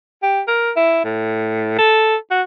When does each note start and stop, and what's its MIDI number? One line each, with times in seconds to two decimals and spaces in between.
0.23 0.41 67
0.48 0.71 70
0.76 1.00 64
1.05 1.76 45
1.78 2.16 69
2.31 2.42 66